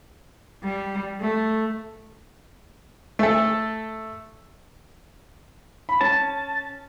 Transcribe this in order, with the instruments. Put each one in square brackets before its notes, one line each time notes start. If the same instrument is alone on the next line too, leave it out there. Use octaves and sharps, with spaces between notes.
[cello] G3
A3
[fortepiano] A3 A4
[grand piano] B5
[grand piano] C#4 [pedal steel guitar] A5